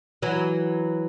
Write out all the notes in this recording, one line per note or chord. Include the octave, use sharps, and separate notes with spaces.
E3 F#3